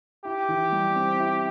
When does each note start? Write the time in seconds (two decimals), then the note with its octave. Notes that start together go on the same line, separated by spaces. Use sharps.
0.25 E4 G4
0.49 E3
0.72 G3
0.96 C4
1.20 E4